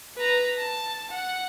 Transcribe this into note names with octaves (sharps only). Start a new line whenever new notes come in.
B4 A#5
A5
F#5